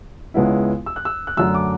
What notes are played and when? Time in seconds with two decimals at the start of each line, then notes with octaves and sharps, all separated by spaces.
0.34 C#2 C#3 G#3 B3 E4
0.86 E6
0.96 F#6
1.05 E6
1.27 F#6
1.37 F#2 D3 A3 E6
1.54 D6